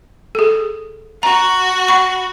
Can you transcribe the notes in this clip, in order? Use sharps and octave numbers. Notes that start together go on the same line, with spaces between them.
G#4 A4
F#4 A#5
F#5 B5 C#6